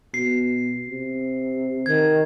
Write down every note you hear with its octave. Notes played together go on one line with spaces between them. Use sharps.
B2 C7
C3
D#3 G#6